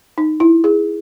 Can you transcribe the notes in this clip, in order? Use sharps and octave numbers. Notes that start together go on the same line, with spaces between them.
D#4
E4
G#4